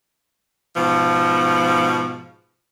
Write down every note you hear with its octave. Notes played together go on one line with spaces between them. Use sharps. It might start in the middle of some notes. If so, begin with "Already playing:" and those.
G#2 B2 F3